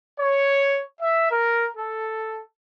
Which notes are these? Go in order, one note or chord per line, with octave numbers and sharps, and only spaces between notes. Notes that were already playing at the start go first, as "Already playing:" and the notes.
C#5
E5
A#4
A4